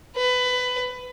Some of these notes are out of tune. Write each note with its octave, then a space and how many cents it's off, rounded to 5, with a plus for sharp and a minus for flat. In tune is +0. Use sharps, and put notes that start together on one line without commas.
B4 +20